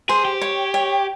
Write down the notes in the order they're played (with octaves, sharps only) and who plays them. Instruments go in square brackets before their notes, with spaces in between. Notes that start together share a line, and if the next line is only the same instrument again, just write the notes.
[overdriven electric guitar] G#4 [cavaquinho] C5
[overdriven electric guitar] G4
[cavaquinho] C#5
C#5